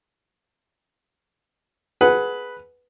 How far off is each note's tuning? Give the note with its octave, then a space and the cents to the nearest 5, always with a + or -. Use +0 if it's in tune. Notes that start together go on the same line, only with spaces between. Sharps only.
G#4 +15 B4 +0 F#5 +0